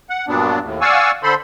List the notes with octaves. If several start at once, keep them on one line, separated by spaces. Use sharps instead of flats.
F#5
G2 A#2 F#3 B3 D4
D#2 A2
D5 F5 F#5 G#5 C#6 E6
D3 A4 C5 B5 C6